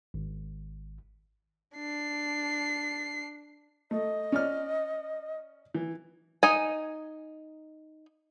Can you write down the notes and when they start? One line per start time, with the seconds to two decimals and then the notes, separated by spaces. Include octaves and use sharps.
0.14 G#1
1.77 D4 C7
3.91 A3 D#5
4.32 C#4 D5 F6
5.74 E3
6.43 D#4 G#5